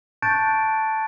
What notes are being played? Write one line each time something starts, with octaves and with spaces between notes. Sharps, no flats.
A5 C#6 F#6 G6 A6 D7